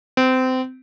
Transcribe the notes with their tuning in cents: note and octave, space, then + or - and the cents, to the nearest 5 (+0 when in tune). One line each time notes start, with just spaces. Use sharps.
C4 -25